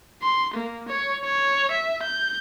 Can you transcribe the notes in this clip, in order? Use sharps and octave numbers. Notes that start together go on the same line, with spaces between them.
C6
A#3
C#5
C#5
E5
G6